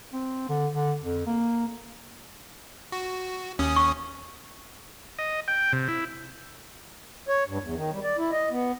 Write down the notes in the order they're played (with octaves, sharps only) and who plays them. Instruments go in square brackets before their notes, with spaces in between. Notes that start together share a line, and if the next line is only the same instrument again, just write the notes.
[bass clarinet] C4
D3
D3
F2
A#3
[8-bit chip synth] F#4
D#2 C#4 D#6
[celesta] C#6
[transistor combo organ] D#5
G5
C3
E4
[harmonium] C#5
G2
E2
D#3
G3
D5
E4
D#5
B3